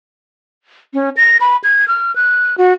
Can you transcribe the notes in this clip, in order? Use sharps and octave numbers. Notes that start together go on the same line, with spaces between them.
C#4
A#6
B5
G#6
F6
F#6
F#4